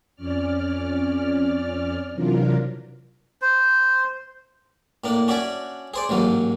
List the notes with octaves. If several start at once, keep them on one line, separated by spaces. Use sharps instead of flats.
F2 C#4 D5 F6
C3 E3 F#3 D4 F4 A#4
C5
A2 A#3 D4
C#4 D4 F#4 D5 E5 G#5
G#4 C5 D5
A1 G#2 F#3 A#3